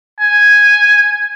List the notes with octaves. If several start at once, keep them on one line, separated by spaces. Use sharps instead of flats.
G#5